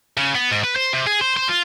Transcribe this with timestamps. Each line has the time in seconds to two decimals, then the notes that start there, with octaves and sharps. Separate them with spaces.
0.17 C#3
0.35 B3
0.51 G#2
0.64 B4
0.76 C5
0.93 C3
1.07 G#4
1.21 C5
1.37 C5
1.49 F4